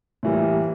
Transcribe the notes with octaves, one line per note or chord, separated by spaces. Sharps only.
A2 E3 G3 A#3